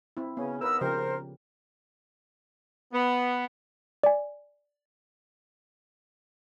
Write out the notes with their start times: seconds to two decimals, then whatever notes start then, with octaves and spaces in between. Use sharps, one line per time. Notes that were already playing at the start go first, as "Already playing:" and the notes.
0.17 C4 E4
0.37 C#3 B3 C#4
0.61 D#2 B3 A#4 B4 E6
0.81 C#3 F3 G4 A#4 C5
2.93 B3
4.04 D5 G#5